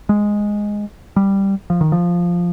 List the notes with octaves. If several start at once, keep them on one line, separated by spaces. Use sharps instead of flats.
G#3
G3
F3
D#3
F3